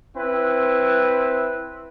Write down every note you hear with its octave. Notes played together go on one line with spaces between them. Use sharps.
C4 E4 B4